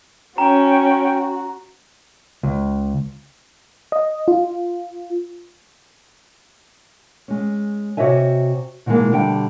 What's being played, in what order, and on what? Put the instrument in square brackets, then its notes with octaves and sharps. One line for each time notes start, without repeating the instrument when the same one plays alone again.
[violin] C#4 [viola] F#4 [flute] G5 [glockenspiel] A#5
[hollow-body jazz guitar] C#2
[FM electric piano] D#5
F4
[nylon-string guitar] G#3 C#4
C3 F#4 C#5 D#5 E5 G#5
B2 D#3 E3 F#3 G#3 A#3
B2 D3 G3 E5 G5